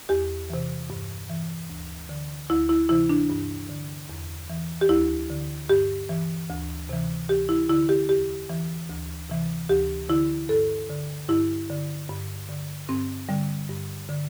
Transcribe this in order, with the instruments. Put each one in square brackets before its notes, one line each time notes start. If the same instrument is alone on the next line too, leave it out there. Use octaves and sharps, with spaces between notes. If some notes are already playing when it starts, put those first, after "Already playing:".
[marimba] E2 G4
C3 E3
G2
E3
D2
D3
D2 E4
E4
C3 E3 E4
D4
G2
D3
E2
E3
G4
D2 E4
D3
G2 G4
E3
D2
C3 E3
D2 G4
E4
D3 E4
G4
E2 G4
E3
D2
C3 E3
D2 G4
D3 E4
G2 A4
D3
G2 E4
D3
G2
D3
G2 C4
D3 G3
G2
D3